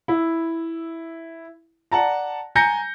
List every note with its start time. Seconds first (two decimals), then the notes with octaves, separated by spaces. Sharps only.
0.08 E4
1.92 D5 F#5 A5 A#5
2.55 G#5 A#5 G6 A#6 C#7